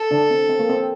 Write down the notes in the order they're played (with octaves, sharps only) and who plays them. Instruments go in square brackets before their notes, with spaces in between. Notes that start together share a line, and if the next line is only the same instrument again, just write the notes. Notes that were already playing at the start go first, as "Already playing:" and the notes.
Already playing: [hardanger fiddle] A4
[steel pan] D3 D4
C4
C4
A#3
C4